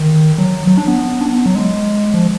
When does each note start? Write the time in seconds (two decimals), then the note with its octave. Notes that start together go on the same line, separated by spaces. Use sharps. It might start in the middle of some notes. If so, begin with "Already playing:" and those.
Already playing: D#3
0.38 F#3
0.67 F#3
0.78 D4
0.88 B3
1.21 D4
1.26 B3
1.46 F#3
1.55 G#3
2.14 F3